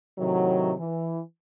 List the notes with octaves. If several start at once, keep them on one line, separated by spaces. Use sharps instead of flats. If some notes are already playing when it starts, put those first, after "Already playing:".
A2 C3 D#3 F#3
E3